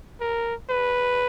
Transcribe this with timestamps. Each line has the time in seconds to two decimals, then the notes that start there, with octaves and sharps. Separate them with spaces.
0.20 A#4
0.70 B4